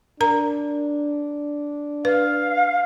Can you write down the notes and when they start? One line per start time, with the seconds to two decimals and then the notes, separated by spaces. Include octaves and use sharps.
0.21 D4 A#4 A#5
2.05 B4 F5